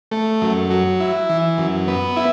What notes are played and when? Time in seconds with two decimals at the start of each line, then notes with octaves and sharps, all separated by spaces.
0.11 A3
0.42 F#2
0.71 F#3
1.00 E4
1.29 E3
1.58 F#2
1.88 B3
2.16 E4